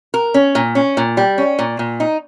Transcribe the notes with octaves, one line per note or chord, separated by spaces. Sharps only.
A#4
C#4
A#2
C#4
A#2
G3
C#4
A#2
A#2
D#4